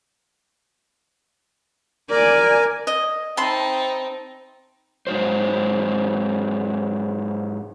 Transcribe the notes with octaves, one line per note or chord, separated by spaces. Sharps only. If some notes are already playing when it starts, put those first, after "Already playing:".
A#4 D5 G#5
D#5
C4 D#4 E5 A5 B5 C6
G#2 C3 F#3 C5